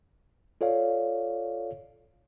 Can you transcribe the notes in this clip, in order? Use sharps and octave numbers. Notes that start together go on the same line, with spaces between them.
F4 A4 C#5 D5 F5